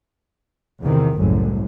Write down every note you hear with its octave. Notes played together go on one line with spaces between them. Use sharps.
E2 C3 D#3
F#1 C2 F#2 A2